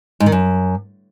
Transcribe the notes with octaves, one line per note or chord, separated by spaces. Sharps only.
G#2
D#3
F#2